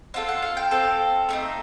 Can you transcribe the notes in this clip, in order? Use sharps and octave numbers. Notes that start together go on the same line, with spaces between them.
C4 F4 A4 F#5
F#5
F5
G5
C4 F4 A4
A3 C4 D#4